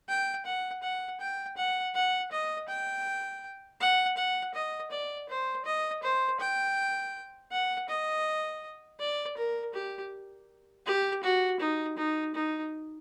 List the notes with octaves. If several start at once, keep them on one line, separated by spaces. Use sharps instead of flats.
G5
F#5
F#5
G5
F#5
F#5
D#5
G5
F#5
F#5
D#5
D5
C5
D#5
C5
G5
F#5
D#5
D5
A#4
G4
G4
F#4
D#4
D#4
D#4